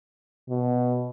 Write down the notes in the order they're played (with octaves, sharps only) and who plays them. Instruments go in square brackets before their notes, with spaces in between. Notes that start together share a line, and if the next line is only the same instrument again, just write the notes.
[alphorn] B2